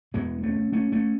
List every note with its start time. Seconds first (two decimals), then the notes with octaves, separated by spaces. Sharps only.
0.14 E2 B2 G#3 B3
0.43 A3 C#4
0.72 A3 C#4
0.92 A3 C#4